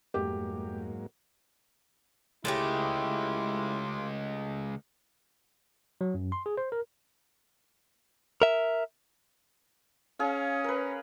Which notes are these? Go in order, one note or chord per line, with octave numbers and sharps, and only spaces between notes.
F2 G#2 F#3 A3 A#3 G4
C#2 G#3 A3 C#4 E4 F4 G4 D6
F#3
F#2
C6
G#4
C5
A#4
A#4 E5
C#4 G#4 F5
A#4 B4